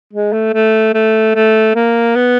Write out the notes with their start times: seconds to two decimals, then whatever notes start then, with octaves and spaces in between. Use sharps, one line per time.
0.13 G#3
0.33 A3
0.53 A3
0.94 A3
1.35 A3
1.75 A#3
2.16 B3